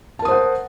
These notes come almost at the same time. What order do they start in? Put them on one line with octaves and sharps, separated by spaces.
A5 A#4 D#6 C5 F#5